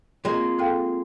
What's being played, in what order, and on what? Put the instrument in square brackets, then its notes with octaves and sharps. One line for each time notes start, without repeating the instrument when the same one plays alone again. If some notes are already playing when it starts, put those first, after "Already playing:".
[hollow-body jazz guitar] G#3 A#3 [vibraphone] C4 F4
[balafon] A4 F5 G5